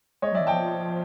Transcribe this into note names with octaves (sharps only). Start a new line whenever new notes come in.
G#3 C#5 D#5
F#3 D5 E5
E3
F3 G5 A5